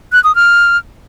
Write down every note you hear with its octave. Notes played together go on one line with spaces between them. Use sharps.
F#6
D#6
F6